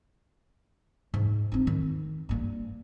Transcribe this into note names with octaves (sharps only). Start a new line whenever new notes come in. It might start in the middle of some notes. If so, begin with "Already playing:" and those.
G#2
C4 D#4
D#3
G2 A#3